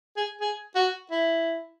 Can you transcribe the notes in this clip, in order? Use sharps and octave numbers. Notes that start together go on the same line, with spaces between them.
G#4
G#4
F#4
E4